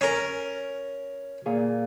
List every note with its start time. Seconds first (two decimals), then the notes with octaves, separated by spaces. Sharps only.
0.01 C#4 A#4
1.46 A#2 G#4